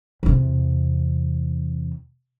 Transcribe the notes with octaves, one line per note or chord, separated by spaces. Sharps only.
E2 C3